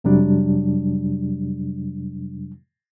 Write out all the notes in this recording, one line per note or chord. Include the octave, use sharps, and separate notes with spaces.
F2 C3 F#3 G3 D4